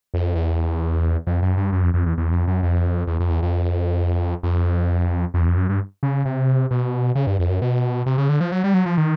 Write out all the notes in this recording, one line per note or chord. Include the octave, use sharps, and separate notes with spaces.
F2
E2
F2
F#2
G2
F#2
F2
F2
E2
E2
F2
F#2
F2
E2
F2
E2
F2
F2
F2
E2
F2
F#2
G2
C#3
C3
B2
C#3
G2
F2
F#2
B2
C3
C#3
D3
F3
F#3
G3
F#3
F3
D#3